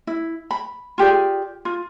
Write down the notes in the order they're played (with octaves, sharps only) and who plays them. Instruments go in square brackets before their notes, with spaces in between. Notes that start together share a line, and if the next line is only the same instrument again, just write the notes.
[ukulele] E4
B5
F4 G4 G#4 D5
F4